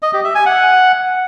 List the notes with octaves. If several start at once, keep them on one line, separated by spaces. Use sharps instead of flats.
D#5
G4
E5
G#5
F#5